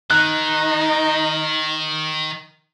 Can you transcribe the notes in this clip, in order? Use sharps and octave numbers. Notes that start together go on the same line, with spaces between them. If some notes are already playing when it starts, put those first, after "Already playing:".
D#3 D#4 F#6